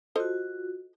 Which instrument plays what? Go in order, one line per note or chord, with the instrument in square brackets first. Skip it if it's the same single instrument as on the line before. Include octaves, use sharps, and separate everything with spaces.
[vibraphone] F4 F#4 [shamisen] A4 C5 D#5